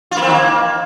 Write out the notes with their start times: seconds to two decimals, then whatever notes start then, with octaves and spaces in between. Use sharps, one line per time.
0.11 F4
0.17 A#3
0.22 C4
0.27 D#3
0.32 A#3